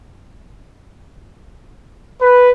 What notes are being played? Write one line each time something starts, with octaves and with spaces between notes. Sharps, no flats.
B4